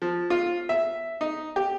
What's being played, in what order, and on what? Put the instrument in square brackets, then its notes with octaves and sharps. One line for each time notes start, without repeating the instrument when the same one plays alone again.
[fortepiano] F3
F4
E5
D#4
G4